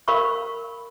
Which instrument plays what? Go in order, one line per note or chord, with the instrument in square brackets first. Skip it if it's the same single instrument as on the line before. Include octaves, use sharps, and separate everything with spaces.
[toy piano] A#4 F5 B5 C#6